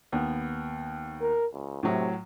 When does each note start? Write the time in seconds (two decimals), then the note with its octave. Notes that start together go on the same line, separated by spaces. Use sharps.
0.12 D#2 B3
1.21 A#4
1.53 C#2
1.83 A2 C3 F#3